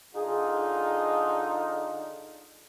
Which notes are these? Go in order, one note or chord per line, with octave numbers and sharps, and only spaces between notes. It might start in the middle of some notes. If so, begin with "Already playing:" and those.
D3 D#4 F4 G#4